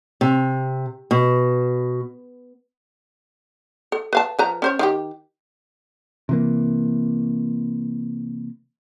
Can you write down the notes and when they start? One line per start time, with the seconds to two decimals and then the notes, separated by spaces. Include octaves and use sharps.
0.21 C3
1.11 B2
3.92 A4
4.13 B4 F5 A5
4.39 F3 B4 A#5
4.62 C#4 C5 C#5
4.79 D#3 F4 G4
6.29 C3 E3 A#3